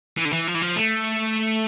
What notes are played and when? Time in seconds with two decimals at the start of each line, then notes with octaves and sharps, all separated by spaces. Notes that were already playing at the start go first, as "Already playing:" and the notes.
0.17 E3
0.25 D3
0.32 E3
0.47 F3
0.54 E3
0.62 F3
0.76 A3